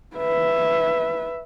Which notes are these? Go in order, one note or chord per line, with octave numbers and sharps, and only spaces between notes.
B4 E5